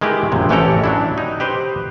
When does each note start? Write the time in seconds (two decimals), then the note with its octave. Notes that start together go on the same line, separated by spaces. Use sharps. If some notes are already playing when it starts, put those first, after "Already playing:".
0.01 D#3 G#3 E4 G4 B4
0.32 A#1 F#2 C3
0.49 A1 E3 C#4 G4 A4 A#5
0.84 F#3 D4 E4
1.18 D#4
1.40 G4 B4 C5